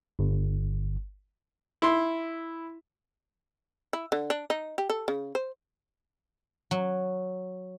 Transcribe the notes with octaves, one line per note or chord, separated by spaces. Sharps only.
G1
E4 C6
E4
D3
D4
D#4
G4
A4
C#3
C5
F#3